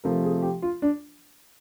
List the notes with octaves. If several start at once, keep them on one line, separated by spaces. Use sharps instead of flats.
C3 F3 A3 A#4
G#4
G4
F4
D4